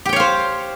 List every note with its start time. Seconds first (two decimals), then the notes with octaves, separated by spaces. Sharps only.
0.05 G4
0.09 G5
0.13 C#5
0.16 F5
0.20 C5